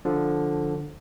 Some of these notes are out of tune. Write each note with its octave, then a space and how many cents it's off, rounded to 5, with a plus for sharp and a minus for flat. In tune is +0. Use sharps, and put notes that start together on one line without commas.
D3 +0 F3 +5